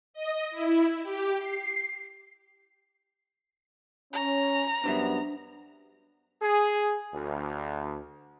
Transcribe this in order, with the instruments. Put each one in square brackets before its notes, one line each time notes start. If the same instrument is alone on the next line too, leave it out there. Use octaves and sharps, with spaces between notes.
[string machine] D#5
E4
G4
C7
[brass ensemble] C#4 [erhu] A#5
[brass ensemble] F#2 G3 B3 [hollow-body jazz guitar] D4 C5 E5
[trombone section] G#4
D2